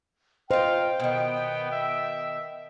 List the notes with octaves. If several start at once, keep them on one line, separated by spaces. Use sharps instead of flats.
D#4 F4 C5 F5 G5
B2 D#3 B3
E5